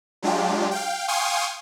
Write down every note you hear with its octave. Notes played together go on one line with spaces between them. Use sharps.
F#3 G#3 D4 F4 G4
F5 G5
F5 G5 G#5 C6 C#6 D#6